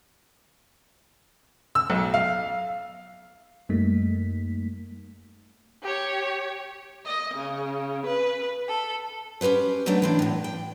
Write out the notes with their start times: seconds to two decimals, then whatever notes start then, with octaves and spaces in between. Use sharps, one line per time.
1.75 E6
1.90 B1
2.14 F5
3.69 F#2 G3 A3 A#3 D#4 B6
5.82 G4 C#5
7.05 D#5
7.35 C#3
8.06 B4
8.68 A4
9.41 C#4 G4 A4 B4 C5
9.86 F#3 A3 B3 C4 D4
10.02 E3 C4 D4
10.19 E2 A2
10.44 G5